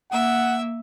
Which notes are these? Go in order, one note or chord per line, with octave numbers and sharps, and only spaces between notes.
A#3 E5 F#5